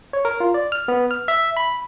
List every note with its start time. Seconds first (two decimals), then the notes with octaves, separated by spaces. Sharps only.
0.13 C#5
0.25 A#4
0.40 F4
0.54 D5
0.72 F6
0.88 B3
1.11 F6
1.28 E5
1.57 B5